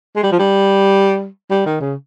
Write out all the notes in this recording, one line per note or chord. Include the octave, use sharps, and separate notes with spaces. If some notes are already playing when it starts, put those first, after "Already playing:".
G#3
G3
F3
G3
G3
D#3
C#3